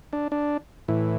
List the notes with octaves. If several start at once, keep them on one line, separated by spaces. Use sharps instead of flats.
D4
D4
A2 E3